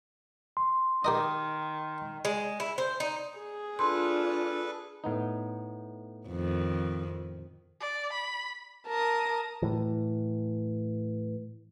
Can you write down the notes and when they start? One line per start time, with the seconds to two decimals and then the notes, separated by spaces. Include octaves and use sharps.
0.57 C6
1.04 D#3 G4 A#4 D#5
2.25 G#3
2.60 E4
2.78 C5
3.00 D#4
3.38 G#4
3.79 D4 F4 A4 B4 C6
5.04 A2 B3 D#4
6.29 F2 D#3
7.81 D5
8.12 B5
8.88 A#4 A5 D#6
9.62 A2 E3